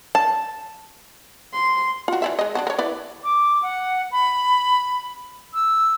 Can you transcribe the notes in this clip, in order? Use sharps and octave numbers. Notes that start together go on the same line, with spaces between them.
A5
C6
F4 F#4
E3 D5 E5
G#3 D#5
D4 D#4 F#4
A#4 C#5
E4 B4 D5
D6
F#5
B5
E6